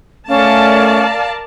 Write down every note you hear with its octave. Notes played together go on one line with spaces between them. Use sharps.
A3 C#4 A#4 D5 F5 A5